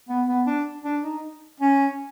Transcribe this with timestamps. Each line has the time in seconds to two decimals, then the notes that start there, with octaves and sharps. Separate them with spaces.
0.09 B3
0.28 B3
0.47 D4
0.84 D4
1.04 D#4
1.60 C#4